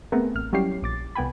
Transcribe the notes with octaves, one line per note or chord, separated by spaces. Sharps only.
A3 B3 C4 G#4 A#4
A1 F6
F#3 G3 C#4 E4 G4 C7
A#1 D6 A6
C2 B3 G5 G#5 B5